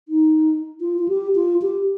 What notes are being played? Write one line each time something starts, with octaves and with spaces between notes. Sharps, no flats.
D#4
F4
F4
G4
F4
G4